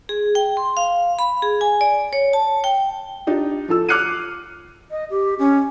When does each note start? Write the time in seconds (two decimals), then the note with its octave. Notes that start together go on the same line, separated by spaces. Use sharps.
0.09 G#4
0.35 G5
0.57 C6
0.77 F5
1.19 B5
1.42 G#4
1.61 G#5
1.81 D5
2.13 C#5
2.33 A5
2.64 G5
3.27 D4 D#4 F4 G4
3.68 F3 F4 A4 E6
3.89 D6 F6 F#6 C7 C#7 D#7
4.91 D#5
5.10 G4
5.39 C#4